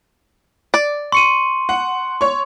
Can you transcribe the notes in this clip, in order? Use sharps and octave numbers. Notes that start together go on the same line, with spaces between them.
D5
C6 C#6 C#7 D#7
F#5
C#5 C#6